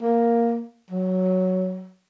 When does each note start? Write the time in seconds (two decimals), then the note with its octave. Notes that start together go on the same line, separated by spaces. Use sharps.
0.02 A#3
0.90 F#3